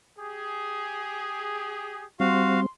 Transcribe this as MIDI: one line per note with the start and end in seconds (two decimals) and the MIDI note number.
0.18 2.05 67
0.18 2.05 68
2.20 2.66 55
2.20 2.66 60
2.20 2.60 66
2.20 2.60 77
2.20 2.69 84